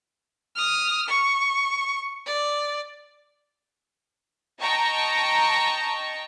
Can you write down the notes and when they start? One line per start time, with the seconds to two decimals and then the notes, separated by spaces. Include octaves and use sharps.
0.55 D#6 F6
1.08 C#6
2.26 D5
4.61 D#5 G5 A5 A#5 C#6